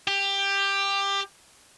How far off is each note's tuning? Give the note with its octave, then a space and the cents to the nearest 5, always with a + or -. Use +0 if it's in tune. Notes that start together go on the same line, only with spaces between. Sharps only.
G4 +15